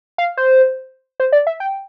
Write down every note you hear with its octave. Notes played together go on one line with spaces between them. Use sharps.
F5
C5
C5
D5
E5
G5